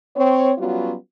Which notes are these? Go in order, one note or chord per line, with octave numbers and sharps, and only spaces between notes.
C4 C#5
F#3 G3 B3 C#4 F4 F#4